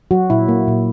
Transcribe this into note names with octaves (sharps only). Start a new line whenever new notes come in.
F#3 F#4
A#2 E4
A#3
A#2